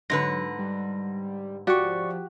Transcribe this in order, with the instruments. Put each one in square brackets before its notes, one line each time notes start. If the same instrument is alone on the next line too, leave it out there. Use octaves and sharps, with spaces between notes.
[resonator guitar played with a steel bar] G#2 D3 B4 [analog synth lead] F#3 [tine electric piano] A#6
[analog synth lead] G3
[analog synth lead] F3 [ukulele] F#4 G4 [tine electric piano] D5 C#6